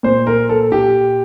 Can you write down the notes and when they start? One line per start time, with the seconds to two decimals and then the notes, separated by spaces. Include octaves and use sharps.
0.03 A#2 C5
0.27 A#4
0.49 A4
0.72 G4